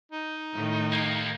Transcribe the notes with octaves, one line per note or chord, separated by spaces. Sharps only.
D#4
A2 D#3
A#3 G4